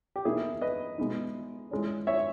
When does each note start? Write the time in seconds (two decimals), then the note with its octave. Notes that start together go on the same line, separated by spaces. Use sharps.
0.16 G4
0.25 B2 A#3 D#4 E4 G#4
0.61 B4 D#5
0.98 B2 G#3 B3 D#4
1.71 E3 G#3 C#4
2.07 C#5 E5